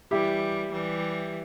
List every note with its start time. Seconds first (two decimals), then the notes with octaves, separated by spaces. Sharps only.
0.11 E3 G3 E4 G4
0.72 E3 G3